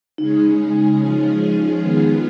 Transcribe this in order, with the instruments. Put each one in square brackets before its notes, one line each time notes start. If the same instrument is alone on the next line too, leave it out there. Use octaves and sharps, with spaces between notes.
[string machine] C#3 G#3 C#4 G#4 [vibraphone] D#4
[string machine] F3 G#3 C#4 F4 G#4
D#3 G#3 B3 F4 G#4